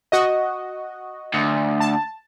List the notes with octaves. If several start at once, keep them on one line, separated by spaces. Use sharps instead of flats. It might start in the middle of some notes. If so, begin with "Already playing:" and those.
F#4 D#5
D2
A5